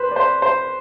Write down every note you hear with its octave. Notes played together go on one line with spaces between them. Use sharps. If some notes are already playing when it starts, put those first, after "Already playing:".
Already playing: B4 C5
D5
C5
C5